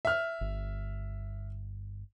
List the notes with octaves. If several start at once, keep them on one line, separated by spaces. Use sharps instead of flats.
E5 F6
G1